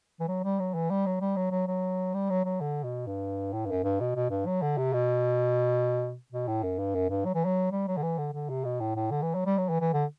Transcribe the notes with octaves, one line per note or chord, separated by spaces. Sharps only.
E3
F#3
G3
F#3
E3
G3
F#3
G3
F#3
F#3
F#3
G3
F#3
F#3
D3
B2
G2
A2
G2
F#2
G2
B2
B2
G2
F#3
D3
C3
B2
B2
A2
F#2
G2
F#2
G2
F#3
E3
F#3
G3
F#3
D3
E3
D3
D3
C3
B2
A2
A2
D3
E3
F#3
G3
F#3
E3
E3
D3